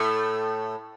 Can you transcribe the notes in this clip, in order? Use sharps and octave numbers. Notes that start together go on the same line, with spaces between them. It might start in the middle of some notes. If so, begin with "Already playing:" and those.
Already playing: A2 A3